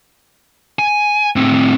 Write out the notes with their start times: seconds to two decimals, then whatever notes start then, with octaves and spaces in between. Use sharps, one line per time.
0.79 G#5
1.36 A2 C4